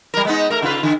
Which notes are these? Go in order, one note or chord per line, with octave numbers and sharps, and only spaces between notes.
G3 A#4
G#3 B3 D#4
A3 A#4
C#3 F4 B4
D3